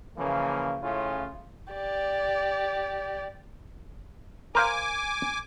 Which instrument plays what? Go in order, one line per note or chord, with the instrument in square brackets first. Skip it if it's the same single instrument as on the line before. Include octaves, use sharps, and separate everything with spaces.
[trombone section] C#3 E3 F3 A#3
A2 C#3 C#4 E4 F4
[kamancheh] G4 D5
[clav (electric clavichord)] A#4 C5 F5 [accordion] G#5 D6